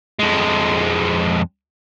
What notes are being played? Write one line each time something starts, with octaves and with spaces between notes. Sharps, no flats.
F2 G#3